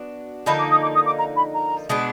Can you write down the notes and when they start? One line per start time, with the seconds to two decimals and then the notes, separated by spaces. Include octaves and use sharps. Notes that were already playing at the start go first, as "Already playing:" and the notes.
Already playing: B3 D4 F#4
0.46 D3 F3 A#3 D#4 B5
0.58 D6
0.70 D#6
0.82 D6
0.95 D#6
1.06 D6
1.18 A#5
1.36 B5
1.54 A#5
1.89 B2 G#3 B3 D4